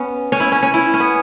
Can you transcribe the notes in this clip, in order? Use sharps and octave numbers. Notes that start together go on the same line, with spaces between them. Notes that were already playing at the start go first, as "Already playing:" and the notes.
Already playing: B3 C#4
C#4
E4
C#4
C#4
E4
C#4
B3